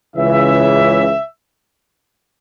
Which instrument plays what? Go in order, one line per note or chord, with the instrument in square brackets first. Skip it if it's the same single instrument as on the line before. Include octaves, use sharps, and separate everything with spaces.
[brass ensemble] C#2 C#3 E3 E5